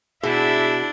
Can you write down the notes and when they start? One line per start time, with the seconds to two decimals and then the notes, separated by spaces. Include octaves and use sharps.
0.23 B2 D4 E4 G#4 E5